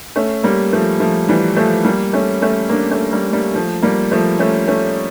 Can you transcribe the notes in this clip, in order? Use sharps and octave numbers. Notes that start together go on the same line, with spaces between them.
A3 C#4
G3 A#3
F3 A3
F3 A3
E3 G3
F3 A3
G3 A#3
A3 C#4
A3 C#4
A#3 D4
A3 C#4
G3 A#3
G3 A#3
F3 A3
G3 A#3
F3 A3
A3 C#4
A3 C#4